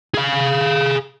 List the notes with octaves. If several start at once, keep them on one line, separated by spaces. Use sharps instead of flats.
G#4 F5